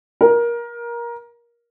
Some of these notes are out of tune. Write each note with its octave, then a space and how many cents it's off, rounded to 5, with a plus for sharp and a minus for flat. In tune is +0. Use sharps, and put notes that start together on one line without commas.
A#4 +20